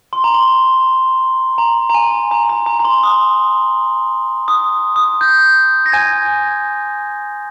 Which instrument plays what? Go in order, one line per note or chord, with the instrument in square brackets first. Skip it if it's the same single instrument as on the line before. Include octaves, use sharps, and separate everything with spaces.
[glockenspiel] C6
A#5
C6
A#5
A#5
G#5
A#5
A#5
A#5
A#5
C6
D#6
D#6
D#6
G6
A#6
G#5 G#6